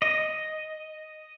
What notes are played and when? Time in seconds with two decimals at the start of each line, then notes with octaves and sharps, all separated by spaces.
0.02 D#5